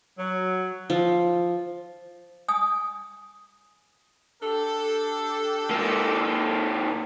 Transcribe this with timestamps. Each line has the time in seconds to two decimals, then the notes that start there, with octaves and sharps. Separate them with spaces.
0.18 F#3
0.90 F3
2.48 G#5 D#6
4.42 D4 G4 A4
5.70 G#2 A#3